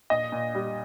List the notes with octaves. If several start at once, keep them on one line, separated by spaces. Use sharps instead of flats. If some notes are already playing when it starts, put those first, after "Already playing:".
A#2 D#5
A#2
G3